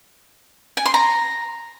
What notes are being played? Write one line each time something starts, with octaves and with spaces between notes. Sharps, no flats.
G#5
C6
A#5